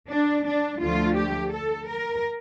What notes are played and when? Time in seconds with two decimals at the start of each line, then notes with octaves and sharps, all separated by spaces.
0.09 D4
0.45 D4
0.81 D2 D3 F3 A3 F4
1.17 G4
1.54 A4
1.89 A#4